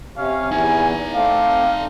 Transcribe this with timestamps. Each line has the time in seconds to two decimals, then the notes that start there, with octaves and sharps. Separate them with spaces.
0.17 C3 C#4 F5
0.52 E2 E3 D#4 E5 G#5
1.14 A3 C4 D5 F5